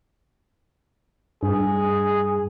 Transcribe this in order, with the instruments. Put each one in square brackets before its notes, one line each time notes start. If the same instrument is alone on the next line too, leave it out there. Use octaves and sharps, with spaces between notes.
[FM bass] G2 [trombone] G#4